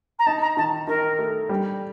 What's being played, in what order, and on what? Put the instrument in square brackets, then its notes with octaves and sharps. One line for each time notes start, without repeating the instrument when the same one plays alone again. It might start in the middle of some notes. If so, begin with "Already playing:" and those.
[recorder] A#5
[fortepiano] D#4 [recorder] A5
[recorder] A#5
[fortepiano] D#3 [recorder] A5
[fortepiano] D#3 [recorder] A#4
[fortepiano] A3
G3